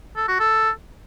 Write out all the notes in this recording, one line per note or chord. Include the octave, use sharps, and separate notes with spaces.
A4
F#4
A4